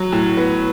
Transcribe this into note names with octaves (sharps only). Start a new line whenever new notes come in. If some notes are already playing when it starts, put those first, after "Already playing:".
Already playing: F#3
A2
B3